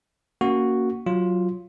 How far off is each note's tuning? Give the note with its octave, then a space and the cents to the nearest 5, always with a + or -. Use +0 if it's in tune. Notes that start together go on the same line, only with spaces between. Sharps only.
A#3 +0 C#4 +15 F#4 +0
F#3 +0 F4 +0